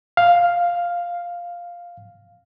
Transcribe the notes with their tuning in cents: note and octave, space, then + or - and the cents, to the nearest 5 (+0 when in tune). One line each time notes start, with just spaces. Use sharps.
F5 +0